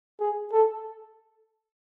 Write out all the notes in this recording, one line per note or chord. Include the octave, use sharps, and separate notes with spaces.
G#4
A4